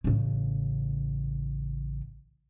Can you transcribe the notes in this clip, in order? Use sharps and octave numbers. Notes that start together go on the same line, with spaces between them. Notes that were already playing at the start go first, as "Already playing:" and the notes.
A1 C#3